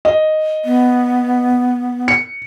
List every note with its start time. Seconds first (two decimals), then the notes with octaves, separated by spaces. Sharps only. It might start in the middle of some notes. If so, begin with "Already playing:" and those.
0.05 D#5
0.65 B3
2.08 C#7